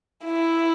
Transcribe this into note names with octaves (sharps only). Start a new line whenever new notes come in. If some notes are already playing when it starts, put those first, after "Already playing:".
E4